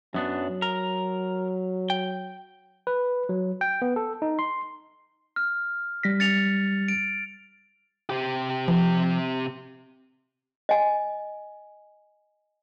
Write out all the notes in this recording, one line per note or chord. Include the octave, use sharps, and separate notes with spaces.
F#2 F#3 B3 D4
A#4
G5
B4
F#3
G5
B3
A4
D#4
C6
F6
G3 A#6 B6
A6 C#7 F7
D7
C3 G4
F3
D#5 G#5